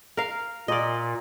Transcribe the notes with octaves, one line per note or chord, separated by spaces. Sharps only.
A#4 F5
A#2 D5 D#5